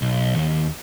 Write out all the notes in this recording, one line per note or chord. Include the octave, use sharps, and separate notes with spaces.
B1
D#2